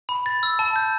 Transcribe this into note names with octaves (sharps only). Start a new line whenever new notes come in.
B5
A6
E6
A5
G6